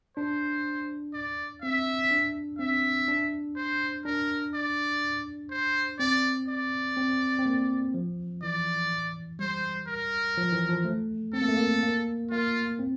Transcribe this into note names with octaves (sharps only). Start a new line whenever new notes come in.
D4 C5
D5
C4 E5
D4
C4 E5
D4
C5
D4 A#4
D5
C5
C4 D5
D5
C4
C4
A#3
F3
E3 D5
G3 C5
A#4
F3
E3
F3
A3
C4 A4
A#3
A3
A#3
A#3
A#3 F4
C4